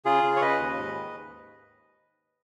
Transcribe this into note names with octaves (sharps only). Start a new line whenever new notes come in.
C#3 F4 G#4
C#3
C#5
C#3 B4 D#5
D#2
G#2
D#3